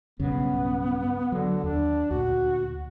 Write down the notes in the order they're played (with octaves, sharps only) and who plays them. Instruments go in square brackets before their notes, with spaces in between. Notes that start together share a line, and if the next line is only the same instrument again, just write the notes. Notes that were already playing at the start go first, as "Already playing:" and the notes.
[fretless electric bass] B1 G2 C#3 [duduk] B3
[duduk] D3 [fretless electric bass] F#3
[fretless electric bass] D#2 [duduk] D4
[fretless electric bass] D2 A#2 [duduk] F#4